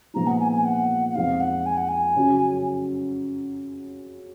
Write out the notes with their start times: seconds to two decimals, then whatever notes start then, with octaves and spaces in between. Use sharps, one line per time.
0.14 A#2 F3 G#3 B3 D#4 A#5
0.27 F#5
0.39 G#5
0.52 G#5
0.65 F#5
1.09 F#5
1.15 F2 F3 G#3 D#4 F5
1.40 F#5
1.66 G#5
1.77 F#5
1.89 G#5
2.16 F#2 C#3 F#3